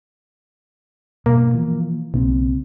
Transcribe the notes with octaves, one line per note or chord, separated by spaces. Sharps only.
G2 B2 A#3
E3 F3
B1 C#3 A#3 C4